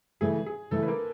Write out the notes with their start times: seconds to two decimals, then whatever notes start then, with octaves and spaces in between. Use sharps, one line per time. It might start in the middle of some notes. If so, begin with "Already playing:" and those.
0.21 C#3 E3 A3 G#4
0.46 G#4
0.71 C#3 E3 A3 A4
0.83 B4
0.88 A#3 A#4